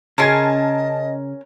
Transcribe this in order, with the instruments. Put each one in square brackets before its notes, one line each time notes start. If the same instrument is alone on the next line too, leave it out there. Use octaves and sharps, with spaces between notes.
[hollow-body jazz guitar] C#3 G#4 [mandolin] C#4 A#4 C6 [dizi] D#5 [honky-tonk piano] A5 G#6